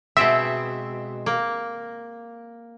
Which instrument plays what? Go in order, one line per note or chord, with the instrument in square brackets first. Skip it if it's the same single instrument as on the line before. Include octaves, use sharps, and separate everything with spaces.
[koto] B2 G#3 C4 [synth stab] E5
[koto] A#3